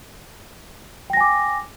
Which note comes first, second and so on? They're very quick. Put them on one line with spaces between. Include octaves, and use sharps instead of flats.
G5 A#6 G#5 D6